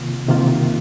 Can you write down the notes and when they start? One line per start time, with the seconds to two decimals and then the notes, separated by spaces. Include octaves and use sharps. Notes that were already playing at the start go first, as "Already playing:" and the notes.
Already playing: C3 D#3 A#3 F4
0.28 C3 D#3 A#3 F4